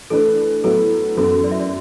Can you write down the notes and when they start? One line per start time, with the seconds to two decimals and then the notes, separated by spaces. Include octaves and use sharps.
0.10 E3 A3 D4 A4 B4
0.64 A2 F#3 B3 E4 A4
1.17 F#2 E3 B3 A4
1.44 D5
1.51 E5
1.60 D5